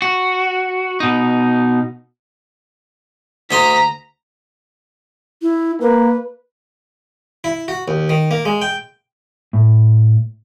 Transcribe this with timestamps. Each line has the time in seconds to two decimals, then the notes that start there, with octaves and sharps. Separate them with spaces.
0.02 F#4
1.00 B2 D#4
3.51 D2 D#5 A#5 C6 B6
5.42 E4
5.81 A#3 B4
7.44 E4
7.68 F#4
7.88 D#2
8.09 D#3
8.31 A#3
8.45 G#3
8.62 G5
9.53 A2